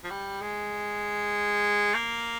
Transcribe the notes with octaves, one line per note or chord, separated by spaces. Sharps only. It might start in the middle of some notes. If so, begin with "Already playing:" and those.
F3
G3
G#3
A#3